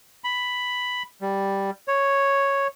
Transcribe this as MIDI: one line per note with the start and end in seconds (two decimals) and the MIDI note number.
0.24 1.03 83
1.21 1.70 55
1.88 2.67 73